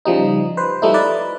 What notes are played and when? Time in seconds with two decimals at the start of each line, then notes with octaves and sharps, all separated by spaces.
0.05 C#3 F3 G3 D#4
0.57 B4 C5
0.82 F3 G3 A3 D#4 E4
0.94 B4 D5